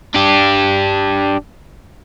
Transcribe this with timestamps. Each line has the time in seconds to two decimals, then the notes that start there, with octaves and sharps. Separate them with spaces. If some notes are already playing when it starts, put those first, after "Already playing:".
0.14 D4 G4